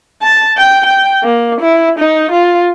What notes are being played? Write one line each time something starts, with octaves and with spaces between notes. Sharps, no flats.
A5
G5
G5
A#3
E4
D#4
F4